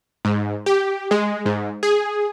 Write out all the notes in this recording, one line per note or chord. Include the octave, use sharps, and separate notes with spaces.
G#2
G4
G#3
G#2
G#4